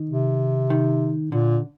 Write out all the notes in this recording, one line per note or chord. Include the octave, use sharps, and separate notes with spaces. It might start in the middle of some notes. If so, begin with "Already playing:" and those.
Already playing: D#3
C3
D#3
A#2 D3